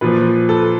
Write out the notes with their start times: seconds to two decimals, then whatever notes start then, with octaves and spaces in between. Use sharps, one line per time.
0.01 A#2 F3 B4
0.49 A4